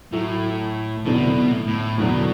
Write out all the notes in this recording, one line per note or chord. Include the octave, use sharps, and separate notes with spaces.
A2 F#3 A3 E4
E2 B2 D3 F#3 B3
C3
B2
A2
A2
E2 B2 D3 F#3 B3